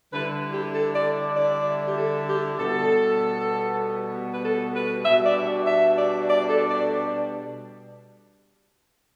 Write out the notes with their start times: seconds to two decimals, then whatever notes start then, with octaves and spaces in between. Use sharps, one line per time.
0.13 D3 G3 E4 B4
0.54 G4
0.74 A4
0.95 D5
1.36 D5
1.88 G4
1.98 A4
2.28 G4
2.59 B2 G3 B3 A4
4.33 B4
4.44 A4
4.75 B4
5.05 B2 G3 D4 E5
5.26 D5
5.67 E5
5.98 D5
6.29 D5
6.49 A4
6.69 D5